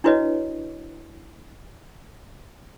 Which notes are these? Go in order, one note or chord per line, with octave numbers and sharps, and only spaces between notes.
D4 E4 F#4 B4 C#5 D#5